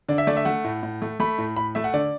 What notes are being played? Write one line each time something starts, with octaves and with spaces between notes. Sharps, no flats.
D3 D5
E5
A3 D5
E5
A3 F#5
A2
A2
A3
A3 B5
A2
A2 B5
A3 E5
F#5
D3 D5